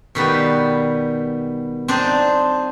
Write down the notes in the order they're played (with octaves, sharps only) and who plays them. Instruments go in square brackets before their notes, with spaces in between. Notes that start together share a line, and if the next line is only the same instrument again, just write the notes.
[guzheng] B2 D#3 G3 B3
C4 D4 D#4